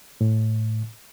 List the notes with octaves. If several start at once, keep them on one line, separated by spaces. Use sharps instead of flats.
A2